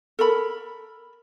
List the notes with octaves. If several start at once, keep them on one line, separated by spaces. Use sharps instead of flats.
A4 A#4 B5